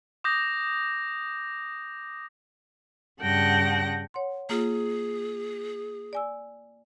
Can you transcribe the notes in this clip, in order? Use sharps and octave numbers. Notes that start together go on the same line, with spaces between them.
D6 D#6 G6 A#6
G2 C#3 F#5 G5 A5 A#6
C#5 F#5 C6
A#3 F4 G#4
D5 G#5 E6